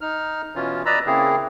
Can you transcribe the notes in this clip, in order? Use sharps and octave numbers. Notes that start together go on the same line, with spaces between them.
D#4 F6
B2 E3 C#4 F4
B4 D5 D#5 A#5 B5 E6
C#3 A#3 C4 E4 G#4